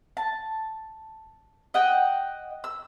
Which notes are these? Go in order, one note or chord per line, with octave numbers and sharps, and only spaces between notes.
A5
D#5 F#5 G5
E6